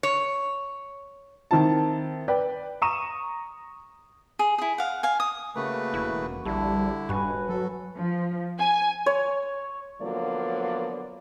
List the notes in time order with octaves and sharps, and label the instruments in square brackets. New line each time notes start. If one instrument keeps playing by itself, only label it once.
[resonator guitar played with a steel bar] C#5
[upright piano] D#3 C4 E4 A5
B4 D5 G5
A#5 C#6 D#6 D#7 E7
[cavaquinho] G#4
E4 G#4
F5 F#5
F5 G#5
D#6
[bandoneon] C#3 A3 B4 [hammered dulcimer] A#3 F#4
[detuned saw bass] E1 [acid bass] E4
[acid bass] A#1 [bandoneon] D3 E4 [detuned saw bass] G3 [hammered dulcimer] A4
[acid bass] D#1 [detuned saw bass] G2 [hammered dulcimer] F#4 B4 G#5
[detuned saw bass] F#3 [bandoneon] A4
[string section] F3
G#5
[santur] C#5
[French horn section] D3 F3 F#3 A#3 B3 D5